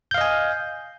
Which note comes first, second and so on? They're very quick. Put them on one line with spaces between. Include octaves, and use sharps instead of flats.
G6 F5 D#5 G#5